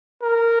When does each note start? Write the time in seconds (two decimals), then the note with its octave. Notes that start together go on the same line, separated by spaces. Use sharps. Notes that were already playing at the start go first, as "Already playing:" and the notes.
0.22 A#4